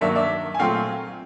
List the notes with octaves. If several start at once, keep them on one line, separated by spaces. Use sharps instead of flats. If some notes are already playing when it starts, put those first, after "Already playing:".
G2 D#3 F#3 A#3 D5 E5
D5 E5
G#5
A#2 F#3 A3 C4 F4 F5 G5